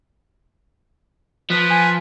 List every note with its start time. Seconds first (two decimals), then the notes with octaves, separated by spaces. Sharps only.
1.50 F3 B4
1.70 G#5